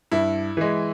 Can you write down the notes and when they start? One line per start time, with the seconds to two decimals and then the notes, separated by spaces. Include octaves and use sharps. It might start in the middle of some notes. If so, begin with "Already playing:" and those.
0.11 G2 E4
0.57 E3 G#3